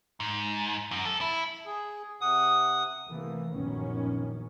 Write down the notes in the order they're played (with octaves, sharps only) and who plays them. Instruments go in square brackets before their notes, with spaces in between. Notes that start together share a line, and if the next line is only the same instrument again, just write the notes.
[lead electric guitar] G#2
F#2
A4
E4
[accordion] G#4
[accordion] C3 F#5 [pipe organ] D#6
[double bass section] C3 E3 A3 A#3
A#1 F#2 A#2 D#3 B3 C#4